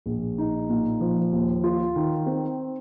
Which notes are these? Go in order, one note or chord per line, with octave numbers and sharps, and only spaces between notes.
A#1
D#4
A#2
F3
D#2
F4
D#3
C4